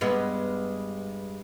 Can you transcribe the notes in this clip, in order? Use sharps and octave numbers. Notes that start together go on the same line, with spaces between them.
G2 G#3 B3